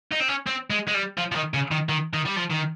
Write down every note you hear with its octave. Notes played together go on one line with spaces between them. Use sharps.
D#4
C4
C#4
C4
G#3
G#3
G3
F3
F3
D#3
C#3
D#3
D#3
D#3
G3
F3
D#3